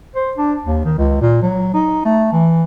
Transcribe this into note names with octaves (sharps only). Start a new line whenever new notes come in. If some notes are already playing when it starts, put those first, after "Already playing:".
C5
D4
D#2
D#3
C#2
A#2
F#3
D#4
A3
E3